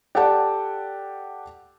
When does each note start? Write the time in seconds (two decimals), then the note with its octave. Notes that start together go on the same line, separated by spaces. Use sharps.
0.15 G4 A4 D5 F#5 G5 A5